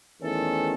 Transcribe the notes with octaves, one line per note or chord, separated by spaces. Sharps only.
E2 D#3 A3 C#4 A4